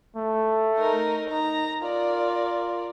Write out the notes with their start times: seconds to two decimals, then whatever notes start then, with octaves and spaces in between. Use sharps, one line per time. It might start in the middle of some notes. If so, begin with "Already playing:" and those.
0.16 A3
0.78 D#4 A#4
1.31 D#4 A#5
1.82 F4 A#4 D5